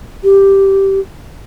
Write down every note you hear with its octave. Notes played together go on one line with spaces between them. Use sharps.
G4